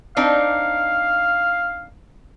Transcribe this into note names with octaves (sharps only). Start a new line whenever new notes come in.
C4 D4 D#4 F5